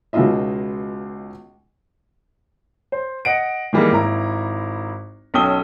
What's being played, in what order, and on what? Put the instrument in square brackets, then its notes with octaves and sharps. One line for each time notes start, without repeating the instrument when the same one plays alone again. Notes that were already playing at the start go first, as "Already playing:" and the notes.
[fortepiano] C#2 B2 D#4 F4 D#5 E5
[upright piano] C5
D#5 F#5 D7
D#3 E3 G3 G#3 A#3
G#1 E4 A#5
B1 C#4 A4 G5 D#6 G7